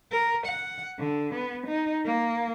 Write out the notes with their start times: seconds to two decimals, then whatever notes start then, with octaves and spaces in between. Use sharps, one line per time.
0.12 A#4
0.47 F#5
0.99 D3
1.35 B3
1.67 D#4
2.05 A#3